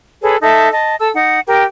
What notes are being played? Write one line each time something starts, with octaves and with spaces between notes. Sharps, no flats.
G#4 A4 B4 C#5
D#4 A4 E5 A5
D#5 A5
A4 A5 E6
D#4 F#5
G4 A#4 G5